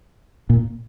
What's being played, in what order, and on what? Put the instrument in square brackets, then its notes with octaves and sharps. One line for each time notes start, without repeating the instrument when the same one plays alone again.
[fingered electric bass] A#2